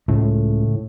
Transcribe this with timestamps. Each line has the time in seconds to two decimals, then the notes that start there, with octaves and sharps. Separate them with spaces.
0.08 C#2 A2